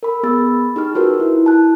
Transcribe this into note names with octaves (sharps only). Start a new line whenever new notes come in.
A#4 B5
B3 G#4 B5 E6 A6
D#4 G4 G#4 F6
F4 F#4 A#4 B4
E4
A5 F#6